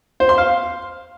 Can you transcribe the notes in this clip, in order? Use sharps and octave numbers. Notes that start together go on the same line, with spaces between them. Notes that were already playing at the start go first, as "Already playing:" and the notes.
C5
C6
F5